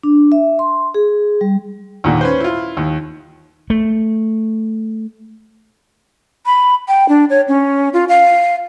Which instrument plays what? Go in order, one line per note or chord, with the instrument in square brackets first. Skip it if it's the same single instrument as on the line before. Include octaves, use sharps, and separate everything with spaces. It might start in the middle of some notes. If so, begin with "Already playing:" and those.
[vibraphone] D4
E5
C6
G#4
G3
[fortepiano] D#2 A#2 D3
C#4 B4 C5
E4 F4
D#2
[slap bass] A3
[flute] B5
G5
D4
C#5
C#4
F4
F5